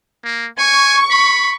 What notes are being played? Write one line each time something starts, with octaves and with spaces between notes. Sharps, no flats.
A#3
G#5 C#6
B5